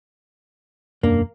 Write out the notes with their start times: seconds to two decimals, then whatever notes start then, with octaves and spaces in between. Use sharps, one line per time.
1.03 E1 F#2 A#3 D4